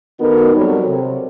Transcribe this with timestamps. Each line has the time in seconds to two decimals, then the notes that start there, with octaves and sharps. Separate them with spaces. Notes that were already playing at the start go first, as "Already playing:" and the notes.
0.20 D#3 B3 D#4 F#4 A4 A#4
0.55 F#3 G3 C4 A4 C#5
0.88 C3